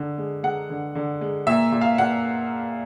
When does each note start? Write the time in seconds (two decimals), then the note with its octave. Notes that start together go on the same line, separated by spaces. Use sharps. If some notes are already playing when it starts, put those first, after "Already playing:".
Already playing: D3
0.18 G#3
0.43 G#3 F#5
0.70 D3
0.95 D3
1.21 G#3
1.47 A#2 E5
1.72 A#2
1.81 F5
1.98 A#2 F#5